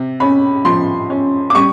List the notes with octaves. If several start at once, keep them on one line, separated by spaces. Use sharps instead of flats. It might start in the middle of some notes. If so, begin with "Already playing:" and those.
Already playing: C3
C#4 B5
F3 C6
C#4
D6
G3 C#6